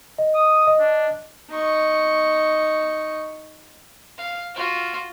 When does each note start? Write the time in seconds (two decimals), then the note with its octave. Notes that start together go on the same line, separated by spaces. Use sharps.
0.18 D#5
0.35 D#6
0.67 D#5
0.79 D4
1.50 D#4 C#6
4.18 F5
4.55 F4 F#4